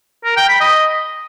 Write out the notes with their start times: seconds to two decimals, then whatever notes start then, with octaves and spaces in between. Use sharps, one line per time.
0.25 A#4
0.37 G5
0.49 B5
0.61 D#5